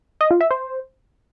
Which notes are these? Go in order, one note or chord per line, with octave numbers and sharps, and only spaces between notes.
D#5
F4
E5
C5